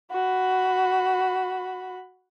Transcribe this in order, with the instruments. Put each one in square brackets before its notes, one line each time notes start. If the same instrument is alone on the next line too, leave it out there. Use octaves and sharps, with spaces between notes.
[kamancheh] F#4 B5